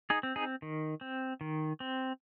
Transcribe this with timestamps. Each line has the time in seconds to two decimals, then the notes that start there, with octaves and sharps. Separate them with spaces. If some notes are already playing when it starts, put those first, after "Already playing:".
0.10 D#4 G#4
0.23 C4
0.36 D#4 G#4
0.62 D#3
1.01 C4
1.41 D#3
1.80 C4